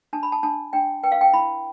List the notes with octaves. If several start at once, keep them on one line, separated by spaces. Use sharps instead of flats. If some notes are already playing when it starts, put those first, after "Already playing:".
D4 A5
B5
A5
D4 A5
D4 G5
B4 G5
F5
G5
E4 B5